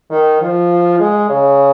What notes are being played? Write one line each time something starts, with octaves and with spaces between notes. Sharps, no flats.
D#3
F3
G#3
C#3